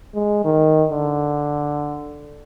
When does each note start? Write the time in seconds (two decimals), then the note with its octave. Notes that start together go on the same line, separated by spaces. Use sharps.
0.14 G#3
0.45 D#3
0.91 D3